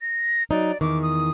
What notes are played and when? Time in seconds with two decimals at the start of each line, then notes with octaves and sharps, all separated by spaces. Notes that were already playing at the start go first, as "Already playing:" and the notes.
0.01 A#6
0.51 F#3 D#4 D5
0.81 E2 D#3 D6
1.02 D#6